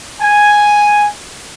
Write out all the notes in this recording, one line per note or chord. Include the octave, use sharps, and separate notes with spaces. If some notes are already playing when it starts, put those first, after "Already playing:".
G#5